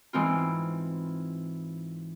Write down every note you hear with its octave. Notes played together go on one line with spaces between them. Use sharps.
G#2 E3 G#3 C4 F4